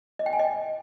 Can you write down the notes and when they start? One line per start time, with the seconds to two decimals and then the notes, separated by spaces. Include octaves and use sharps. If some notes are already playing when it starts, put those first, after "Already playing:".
0.19 D#5
0.26 G5
0.33 G#5
0.39 D#5